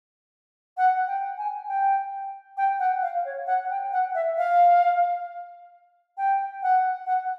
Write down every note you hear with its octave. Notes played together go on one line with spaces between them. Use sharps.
F#5
G5
G#5
G5
G5
F#5
F5
C#5
F#5
G5
F#5
E5
F5
G5
F#5
F#5